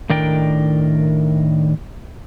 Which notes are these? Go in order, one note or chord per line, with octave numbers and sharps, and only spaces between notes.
A2 D#3 D4 A#4 D5 G5